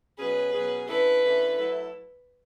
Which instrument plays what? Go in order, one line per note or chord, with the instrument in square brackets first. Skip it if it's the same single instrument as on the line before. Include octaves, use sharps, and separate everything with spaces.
[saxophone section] B2 F#3 C#4 G#4 [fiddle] B4
[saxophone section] B2 F#3 C#4 G#4
[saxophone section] D3 A3 C#4 E4 A4 [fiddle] B4
[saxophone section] D3 A3 C#4 E4 A4
F#3 A3 E4 A4